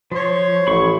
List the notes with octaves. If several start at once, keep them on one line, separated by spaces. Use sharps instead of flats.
F3 C5 C#5
A1 B5 C#6